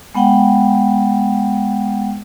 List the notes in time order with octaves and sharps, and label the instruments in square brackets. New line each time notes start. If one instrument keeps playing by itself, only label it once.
[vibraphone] G#3 B3 F#5 G5